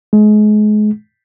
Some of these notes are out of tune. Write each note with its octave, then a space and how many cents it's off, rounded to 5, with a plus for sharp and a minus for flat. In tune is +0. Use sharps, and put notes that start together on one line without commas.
G#3 +30